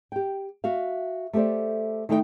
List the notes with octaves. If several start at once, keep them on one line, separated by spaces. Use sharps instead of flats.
G4 G5
F#4 E5 F5
A3 G4 A4 C5 D5
D#3 A3 D#4 E4 F5 G5